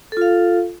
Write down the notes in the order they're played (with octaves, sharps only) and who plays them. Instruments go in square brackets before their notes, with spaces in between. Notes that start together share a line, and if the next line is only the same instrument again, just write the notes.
[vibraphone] A4
F4
F5